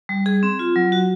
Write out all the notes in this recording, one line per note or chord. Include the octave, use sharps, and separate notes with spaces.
G3
G#4
C4
F4
F#3
F#4